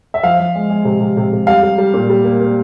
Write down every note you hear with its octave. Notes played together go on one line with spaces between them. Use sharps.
E5
F3 F5
F3
G#3
G#3
C3
C3
C3
C3
G3 F5
G3
G3
A#2
G3
A#3
A#3